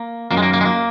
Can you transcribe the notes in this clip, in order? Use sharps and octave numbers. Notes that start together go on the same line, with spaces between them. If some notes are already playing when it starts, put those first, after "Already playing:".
Already playing: A#3
F#2 D#3 A#3
G#3
A#3
A#3
G#3
A#3